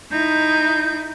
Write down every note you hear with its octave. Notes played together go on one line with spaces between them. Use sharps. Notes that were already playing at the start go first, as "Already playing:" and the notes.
D#4 E4 G6